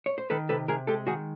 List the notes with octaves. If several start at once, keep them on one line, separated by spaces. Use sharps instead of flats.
C#5
C5
D#3 A4 B4
C3 A4 B4
C3 G#4 A#4
G#3 G4 A4
D#3 F#4 G#4